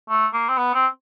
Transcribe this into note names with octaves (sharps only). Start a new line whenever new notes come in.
A3
A#3
C4
B3
C4